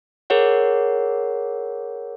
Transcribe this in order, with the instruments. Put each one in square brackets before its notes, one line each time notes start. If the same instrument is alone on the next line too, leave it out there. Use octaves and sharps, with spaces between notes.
[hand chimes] G#4 A#4 C#5 F#5